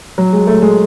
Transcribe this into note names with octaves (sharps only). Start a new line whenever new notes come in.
F#3
G#3
A3
G#3